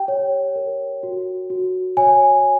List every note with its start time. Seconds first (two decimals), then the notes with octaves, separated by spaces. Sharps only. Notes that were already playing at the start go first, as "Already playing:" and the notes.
Already playing: G4 G5
0.08 C#5
0.56 A#4
1.03 F#4
1.50 F#4
1.97 C#5 G#5